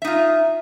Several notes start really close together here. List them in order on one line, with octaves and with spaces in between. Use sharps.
E5 D#4 F4